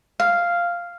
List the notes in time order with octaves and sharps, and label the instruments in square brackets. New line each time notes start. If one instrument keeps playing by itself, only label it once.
[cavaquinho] F5